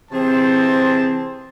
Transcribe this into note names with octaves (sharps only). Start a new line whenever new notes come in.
C3 E3 C4 G#4 C5 A5